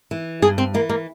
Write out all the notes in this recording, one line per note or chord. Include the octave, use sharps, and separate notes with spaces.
E3
G2 G#4
C4
E3 A#3
A#3